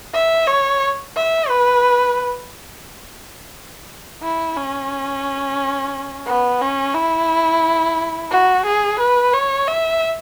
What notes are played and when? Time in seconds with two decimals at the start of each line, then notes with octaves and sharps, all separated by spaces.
0.14 E5
0.47 C#5
1.16 E5
1.49 B4
4.23 E4
4.57 C#4
6.27 B3
6.61 C#4
6.95 E4
8.31 F#4
8.66 G#4
8.99 B4
9.33 C#5
9.67 E5